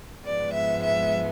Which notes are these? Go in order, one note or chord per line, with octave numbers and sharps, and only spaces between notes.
G#2 F3 G#3 B3 D5
E5
E5